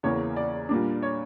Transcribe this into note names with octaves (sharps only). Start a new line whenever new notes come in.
E2 C#3 E3 A#3 C#5
D5
A#2 G3 A#3 D4
C#5